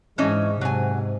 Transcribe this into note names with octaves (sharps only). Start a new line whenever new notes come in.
G#2 E3 G#3 C#4 D#5
G#2 C3 F#3 G#5